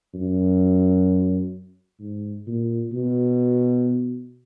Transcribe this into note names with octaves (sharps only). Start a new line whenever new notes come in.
F#2
G#2
A#2
B2